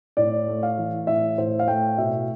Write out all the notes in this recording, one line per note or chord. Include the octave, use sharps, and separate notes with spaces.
A2 D5
A3
F5
E3
A2 E5
A2 C5
F5
A3 G5
B2 E5